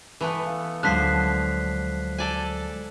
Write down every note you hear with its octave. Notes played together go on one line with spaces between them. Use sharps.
E3 A3 B3
F5
D2 D3 F3 F#3 G#3 F#6 B6 C7
A4 D5 G#5